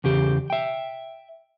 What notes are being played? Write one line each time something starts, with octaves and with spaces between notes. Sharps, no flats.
E2 C#3 G4
E5 G5